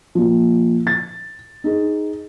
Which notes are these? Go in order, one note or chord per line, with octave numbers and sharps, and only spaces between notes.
A#2 F3
A6
D#4 G#4